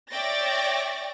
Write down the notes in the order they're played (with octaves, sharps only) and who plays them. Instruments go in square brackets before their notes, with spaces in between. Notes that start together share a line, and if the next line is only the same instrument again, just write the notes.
[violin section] C#5 D5 E5 G5 A6 A#6